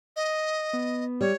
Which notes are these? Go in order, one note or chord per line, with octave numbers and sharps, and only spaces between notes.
D#5
B3
G3 C#5